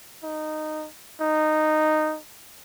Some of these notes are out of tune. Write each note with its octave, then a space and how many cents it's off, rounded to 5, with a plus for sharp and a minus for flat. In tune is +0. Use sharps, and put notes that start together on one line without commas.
D#4 -15
D#4 -10